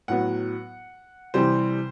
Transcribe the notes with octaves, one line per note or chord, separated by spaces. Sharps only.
A2 F#3 B3 F#5
C3 E3 G3 C4 C5